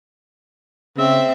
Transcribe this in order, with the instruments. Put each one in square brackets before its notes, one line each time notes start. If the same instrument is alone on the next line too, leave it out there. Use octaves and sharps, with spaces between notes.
[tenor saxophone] C#3 [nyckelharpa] C4 E5